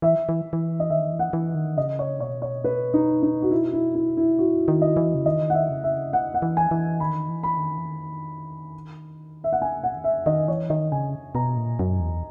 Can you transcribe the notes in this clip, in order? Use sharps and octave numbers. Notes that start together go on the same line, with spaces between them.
E3 E5
E3
E3
D#5
D#3 E5
E3
F#5
E3
D#3
C#3 D#5
C#5
B2 C#5
C#5
B4
D#4
D#4
F#4
E4
E4
E4
E4
A#2 F#4
D#3
D#5
E3
C#3
D#3 D#5
F#5
E5
C#3
E5
F#5
F#5
E3
G#5
E3
D#3 B5
E3
B5
D#3
E3
D#3
E5
F#5
C#3 G#5
B2 F#5
D#3
C#3 E5
D#3 D#5
E3 C#5
D#3 D#5
C#3 G#5
B2 A#5
A#2
F#2
E2